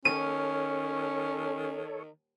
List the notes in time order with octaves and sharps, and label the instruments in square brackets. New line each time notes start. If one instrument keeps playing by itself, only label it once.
[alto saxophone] D#3 [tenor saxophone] C#4 [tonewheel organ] A4 C#5 [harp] D#7